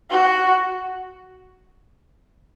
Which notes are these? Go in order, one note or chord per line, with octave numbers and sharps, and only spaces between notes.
F#4